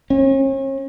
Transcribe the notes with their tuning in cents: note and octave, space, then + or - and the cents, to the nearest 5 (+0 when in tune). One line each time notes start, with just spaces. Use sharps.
C#4 -40